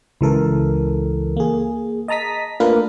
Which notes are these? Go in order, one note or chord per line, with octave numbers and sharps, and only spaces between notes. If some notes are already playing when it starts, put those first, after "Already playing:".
C#2 E3 A4 A#4
A#3 G#4
D#5 A5 A#5 D#6 B6
A3 A#3 D4 F4 A#4 B4